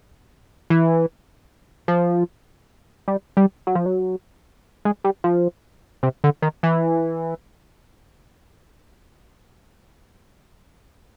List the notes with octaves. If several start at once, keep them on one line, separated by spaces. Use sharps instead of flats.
E3
F3
G3
G3
F#3
F3
F#3
G#3
G3
F3
C3
D3
D#3
E3